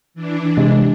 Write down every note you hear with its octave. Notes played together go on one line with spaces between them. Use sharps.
E3 D4
C3 G#3